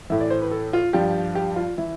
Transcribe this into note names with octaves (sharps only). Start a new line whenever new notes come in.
A2 E3 E5
D5
C5
B4
A4
F4
G2 F3 G4
G4
F4
E3 E4